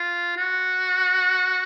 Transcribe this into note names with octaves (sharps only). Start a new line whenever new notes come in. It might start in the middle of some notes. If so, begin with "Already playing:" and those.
Already playing: F4
F#4